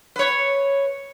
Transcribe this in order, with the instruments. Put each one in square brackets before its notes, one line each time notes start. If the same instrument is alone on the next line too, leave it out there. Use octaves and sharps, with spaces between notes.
[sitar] B4 C#5